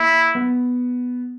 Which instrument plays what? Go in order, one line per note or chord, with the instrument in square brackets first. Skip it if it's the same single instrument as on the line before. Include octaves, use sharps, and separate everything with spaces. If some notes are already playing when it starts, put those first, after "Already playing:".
Already playing: [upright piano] A#3 [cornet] E4
[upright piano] B3